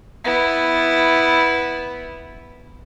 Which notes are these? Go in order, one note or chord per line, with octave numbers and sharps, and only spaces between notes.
B3 E4